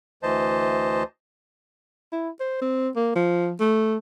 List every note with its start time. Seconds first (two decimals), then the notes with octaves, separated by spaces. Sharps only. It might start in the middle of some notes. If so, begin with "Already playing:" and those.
0.23 D2 E3 C5 D#5 A5
2.12 E4
2.40 C5
2.61 C4
2.96 A#3
3.15 F3
3.60 A3